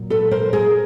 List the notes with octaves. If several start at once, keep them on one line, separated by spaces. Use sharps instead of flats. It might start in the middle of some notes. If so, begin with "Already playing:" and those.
Already playing: A#2 F#3
A4 B4
A#4 C5
G#4 A#4